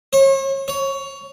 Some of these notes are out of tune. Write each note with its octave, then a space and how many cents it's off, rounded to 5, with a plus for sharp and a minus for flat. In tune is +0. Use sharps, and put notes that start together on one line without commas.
C#5 -40
C#5 +15